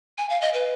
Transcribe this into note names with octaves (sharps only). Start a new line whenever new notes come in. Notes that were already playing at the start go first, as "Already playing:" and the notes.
G#5
F5
D#5
B4